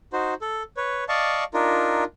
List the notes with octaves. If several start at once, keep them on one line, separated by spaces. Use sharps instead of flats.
D#4 F#4 C5
A4
B4 C#5
D5 D#5 F5 A5 C#6
D4 D#4 F4 A#4